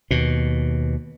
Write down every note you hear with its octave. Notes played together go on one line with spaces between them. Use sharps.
D#2 B2